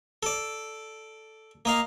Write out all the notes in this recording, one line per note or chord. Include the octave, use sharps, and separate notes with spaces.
A4 D5
A#3 D#5 F5